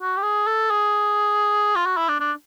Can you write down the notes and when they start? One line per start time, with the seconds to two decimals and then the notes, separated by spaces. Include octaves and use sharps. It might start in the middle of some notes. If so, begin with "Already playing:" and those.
0.01 F#4
0.17 G4
0.23 G#4
0.47 A4
0.71 G#4
1.76 F4
1.86 F#4
1.97 E4
2.09 D4
2.20 D4